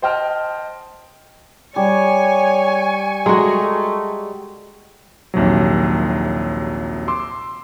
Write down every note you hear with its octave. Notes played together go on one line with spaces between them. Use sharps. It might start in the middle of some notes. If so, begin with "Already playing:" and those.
C5 D#5 G5 A5 F6
G3 C#5 G#5 C#6
G#3 A3 F#4 A#5
A#1 D#2 C3 F#3
C6 D6 E6